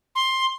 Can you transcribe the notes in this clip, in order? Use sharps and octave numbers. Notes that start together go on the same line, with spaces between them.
C6